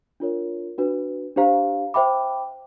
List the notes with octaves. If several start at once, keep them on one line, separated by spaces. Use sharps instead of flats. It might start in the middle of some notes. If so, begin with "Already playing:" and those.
D4 F4 A#4 C#5
D4 F#4 B4
D4 G4 C5 F5 A#5
C5 E5 G5 B5 D6